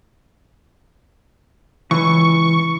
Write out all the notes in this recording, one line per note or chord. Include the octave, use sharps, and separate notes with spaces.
C#2 E3 C#6